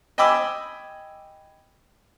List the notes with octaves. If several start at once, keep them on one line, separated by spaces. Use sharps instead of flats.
D#5 G5 G#5 B5 D6 E6